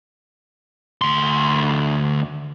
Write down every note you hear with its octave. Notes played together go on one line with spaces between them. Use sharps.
D2 C6